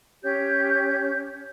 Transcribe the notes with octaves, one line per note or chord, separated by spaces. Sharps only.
C#4 G4 C#5 G6